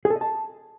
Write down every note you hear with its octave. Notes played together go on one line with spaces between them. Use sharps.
G#4
A4
D#5
A5